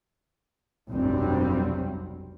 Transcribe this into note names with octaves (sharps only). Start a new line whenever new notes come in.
F1 B1 G2 F#3 G3 C4